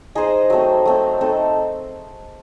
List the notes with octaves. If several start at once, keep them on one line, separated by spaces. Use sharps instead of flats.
D#4 G#4 C5 D#5
F#3 A3 C4
F#3 A3 C4
A3 C4 D#4 A4